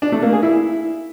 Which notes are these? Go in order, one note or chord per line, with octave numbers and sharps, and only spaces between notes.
D4
A3
A#3
G#4
E4